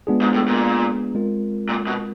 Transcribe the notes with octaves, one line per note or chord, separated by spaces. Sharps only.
G#3 B3 D4 F4 G#4
G#2
A2
A#2
G#3 C4 F4 A#4
A#2
B2